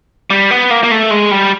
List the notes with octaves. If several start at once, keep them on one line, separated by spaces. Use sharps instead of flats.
G3
B3
A#3
A#3
A3
G#3
G3